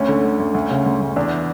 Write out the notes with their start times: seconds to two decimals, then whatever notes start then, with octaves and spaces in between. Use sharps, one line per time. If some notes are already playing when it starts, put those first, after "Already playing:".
Already playing: D2 C#4
0.08 D3
0.24 D2
0.40 D2
0.54 D2
0.70 C#3
0.86 D2
1.01 D2
1.16 E2 D4